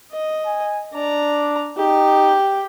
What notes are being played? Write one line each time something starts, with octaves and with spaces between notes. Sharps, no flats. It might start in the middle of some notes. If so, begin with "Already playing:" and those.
D#5
G#5
D4 D5 A#5
D#4 G4 G5